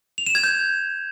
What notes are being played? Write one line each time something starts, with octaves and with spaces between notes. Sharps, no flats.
F7
E7
G#6
G6